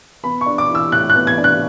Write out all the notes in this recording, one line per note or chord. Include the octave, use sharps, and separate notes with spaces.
B3 B5
C#6
D4
D6
E3 E6
A2 F#6
F#6
B3
G#6
D4
F#6